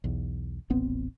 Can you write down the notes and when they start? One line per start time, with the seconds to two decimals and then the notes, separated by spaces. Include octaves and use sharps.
0.04 B1 E2
0.70 D#1 A1 B3 C4